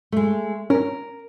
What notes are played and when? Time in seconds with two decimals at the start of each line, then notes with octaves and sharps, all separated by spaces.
0.12 G#3 A3
0.70 C#4 A#4